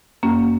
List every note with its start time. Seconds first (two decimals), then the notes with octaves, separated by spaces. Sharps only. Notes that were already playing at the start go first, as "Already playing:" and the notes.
0.23 F#2 A#3 C#4